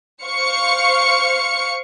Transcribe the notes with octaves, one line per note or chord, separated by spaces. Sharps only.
C5 F5 C#6 C#7